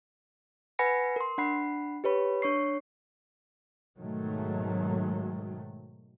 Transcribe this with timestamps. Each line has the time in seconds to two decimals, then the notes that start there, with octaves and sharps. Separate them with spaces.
0.79 B4 F#5 G#5 B5 A#6 C#7
1.16 A#4 C6
1.38 D4 F#5 B5 C7
2.04 G4 B4 C#5 B5
2.42 D4 C#5 C#6 C7
3.97 G#2 B2 D#3 F#3 G#3 A3